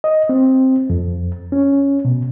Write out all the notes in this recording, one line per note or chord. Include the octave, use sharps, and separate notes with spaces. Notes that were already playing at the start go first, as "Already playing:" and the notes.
D#5
C4
F2
C#4
B2